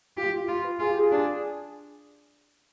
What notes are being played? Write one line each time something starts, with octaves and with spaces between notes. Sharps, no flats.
F4 G4
F4
F4
B4
F4 G#4
G4
G#4
D4